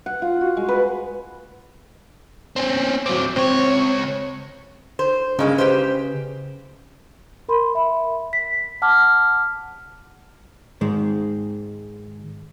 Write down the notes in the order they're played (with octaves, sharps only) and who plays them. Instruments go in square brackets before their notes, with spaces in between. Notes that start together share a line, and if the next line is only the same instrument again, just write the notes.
[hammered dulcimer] F#5
F4
F#4
G#3
B4
[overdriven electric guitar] C4 C#4
[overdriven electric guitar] F#3 C4 [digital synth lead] D6
[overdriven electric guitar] C#2 C#5 [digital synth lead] C4
[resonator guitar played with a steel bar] C5
[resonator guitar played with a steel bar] G2 G#3 A#3 [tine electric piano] C#3
[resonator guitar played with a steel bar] G4 B4 C5
[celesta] A#4 B5 C6
E5 B5
B6
F#5 A5 D6 F6
[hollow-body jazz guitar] G#2 D#3 G#3